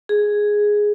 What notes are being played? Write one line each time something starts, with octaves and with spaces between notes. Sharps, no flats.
G#4